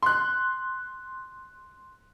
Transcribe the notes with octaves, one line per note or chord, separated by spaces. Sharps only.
C6 F#6